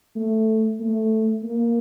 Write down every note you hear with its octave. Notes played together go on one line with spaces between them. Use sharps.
A3
A3
A#3